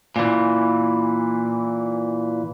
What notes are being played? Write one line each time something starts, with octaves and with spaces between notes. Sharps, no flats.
A#2 E3